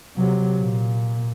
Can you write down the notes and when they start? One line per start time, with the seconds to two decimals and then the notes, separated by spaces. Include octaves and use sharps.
0.17 C3 F#3
0.60 A#2